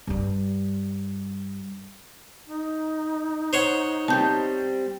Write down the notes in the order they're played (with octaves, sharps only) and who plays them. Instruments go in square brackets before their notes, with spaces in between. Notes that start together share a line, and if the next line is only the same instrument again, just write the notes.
[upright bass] G2 G3
[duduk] D#4
[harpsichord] C5 C#5 F#5
[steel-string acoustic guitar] G3 C4 [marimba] A5 G6